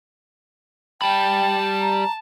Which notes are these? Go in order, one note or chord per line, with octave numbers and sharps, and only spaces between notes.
G3 G5 A5 B5
A#5